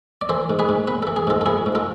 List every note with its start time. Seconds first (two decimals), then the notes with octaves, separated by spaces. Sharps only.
0.21 D5
0.29 E3 A4 C5
0.50 G#2
0.59 G#4 B4
0.69 G#2
0.87 B3 B4
1.03 E3 A4
1.16 G#4
1.27 G#2 F4 A4
1.41 A4
1.46 F3 E4 G#4
1.66 G#2
1.75 F4 A4